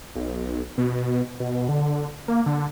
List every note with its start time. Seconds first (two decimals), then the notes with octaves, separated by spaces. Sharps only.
0.15 B1
0.78 B2
1.40 B2
1.69 D3
2.28 A#3
2.46 D3